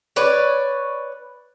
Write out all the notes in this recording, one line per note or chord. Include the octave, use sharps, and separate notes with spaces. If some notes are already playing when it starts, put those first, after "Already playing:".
B4 C#5 D5